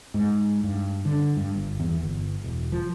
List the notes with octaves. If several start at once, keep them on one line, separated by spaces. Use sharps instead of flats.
G#2
G2
D3
G2
G1
E2
G1
E1
F3